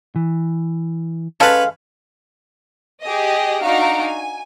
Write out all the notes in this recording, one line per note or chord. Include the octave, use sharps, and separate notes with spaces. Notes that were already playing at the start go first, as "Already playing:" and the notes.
E3
G#3 C#4 A4 B4 F5
G4 G#4 D#5
D4 D#4 F#4 F5 A#5 D7
G#5